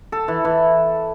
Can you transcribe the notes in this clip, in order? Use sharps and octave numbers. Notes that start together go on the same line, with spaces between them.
A4
E3
E3